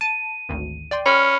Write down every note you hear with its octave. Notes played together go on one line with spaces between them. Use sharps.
A5 D#7
G#1 D2
D5 G5 C6
C#4 B5 F6